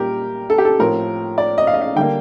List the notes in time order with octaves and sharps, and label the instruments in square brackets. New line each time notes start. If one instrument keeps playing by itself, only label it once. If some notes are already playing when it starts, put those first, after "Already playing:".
Already playing: [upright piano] A#2 G3 G4 A#4
A4
G4
A4
A2 F3 C4 A#4
D5
D#5
F5
D#5
F5
D3 G3 A#3 G5